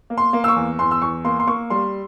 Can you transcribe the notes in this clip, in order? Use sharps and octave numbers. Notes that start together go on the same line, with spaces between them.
A#3
C6
A#3
E6
C#6
E2
E2 C6
E6
E2 C#6
A#3 C6
C6
A#3 C#6
G3 C6